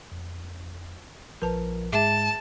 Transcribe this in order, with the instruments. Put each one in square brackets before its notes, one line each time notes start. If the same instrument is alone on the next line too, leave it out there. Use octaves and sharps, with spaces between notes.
[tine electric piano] F2
[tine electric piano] A#1 F3 A#4 [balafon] B4 A5
[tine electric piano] G#2 G#3 [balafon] G#4 E5 [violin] A5